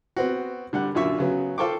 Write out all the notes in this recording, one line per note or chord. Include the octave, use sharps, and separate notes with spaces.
B3 C4 F#4
D3 G3 F#5 F#6
F#2 A#2 D3 E5 C#6
C#3 F#3 B3
F4 A4 C5 G5 C#6 D6